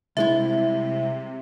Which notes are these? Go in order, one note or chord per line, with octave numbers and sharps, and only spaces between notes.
C2 C3 G#3 E4 E5